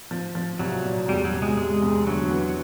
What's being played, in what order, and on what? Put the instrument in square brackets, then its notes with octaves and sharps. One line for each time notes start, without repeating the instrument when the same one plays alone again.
[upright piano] F3
F3
[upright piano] C2 [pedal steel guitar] F#3
[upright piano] A#2
[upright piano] E1 [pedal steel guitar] G3
[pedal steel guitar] F#3
[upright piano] C3
[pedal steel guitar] G#3
[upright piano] C3 [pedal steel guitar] G#3
[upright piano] E1
[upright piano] D2 [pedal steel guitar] F#3
[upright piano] E3